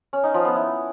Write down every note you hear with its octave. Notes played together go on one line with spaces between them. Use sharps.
C#4
D#4
F3
B3
E4